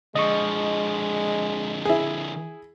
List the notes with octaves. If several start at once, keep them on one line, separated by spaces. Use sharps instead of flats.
D3 F3 G#3 D#5 C#6
E4 G#4